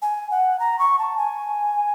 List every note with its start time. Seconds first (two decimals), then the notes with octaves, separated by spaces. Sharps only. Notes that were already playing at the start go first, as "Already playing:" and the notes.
0.02 G#5
0.31 F#5
0.60 A#5
0.79 C#6
0.99 A5
1.17 G#5